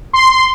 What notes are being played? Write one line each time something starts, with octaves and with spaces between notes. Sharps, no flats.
C6